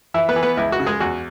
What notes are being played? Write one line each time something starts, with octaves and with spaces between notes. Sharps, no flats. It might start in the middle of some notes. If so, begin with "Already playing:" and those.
E3 E4 E5
B3 B4
E3
B3 B4
C#2 E4
F#4
C#3
G#3 G#4
E2 F#4